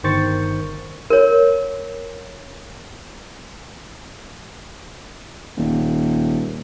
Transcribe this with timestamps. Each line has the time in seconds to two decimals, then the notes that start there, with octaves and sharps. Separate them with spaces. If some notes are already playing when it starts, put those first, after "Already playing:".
0.04 G1 D#3 C5 C#6 A6 C#7
1.10 A#4 C#5
5.57 D#1